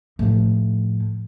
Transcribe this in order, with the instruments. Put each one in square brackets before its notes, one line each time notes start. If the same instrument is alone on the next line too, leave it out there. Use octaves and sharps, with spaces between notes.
[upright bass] A2 F3